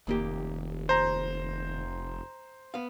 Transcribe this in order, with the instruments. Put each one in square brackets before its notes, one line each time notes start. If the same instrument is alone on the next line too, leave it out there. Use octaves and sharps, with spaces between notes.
[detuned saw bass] F1 [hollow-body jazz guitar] D#2 A#3 G4
[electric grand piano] C5 A#5
[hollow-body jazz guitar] B3 F5